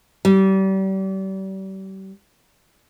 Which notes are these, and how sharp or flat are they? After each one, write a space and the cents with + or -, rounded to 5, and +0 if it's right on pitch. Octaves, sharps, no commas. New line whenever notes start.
G3 -35